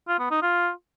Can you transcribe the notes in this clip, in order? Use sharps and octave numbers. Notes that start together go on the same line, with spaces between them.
F4
B3
D#4
F4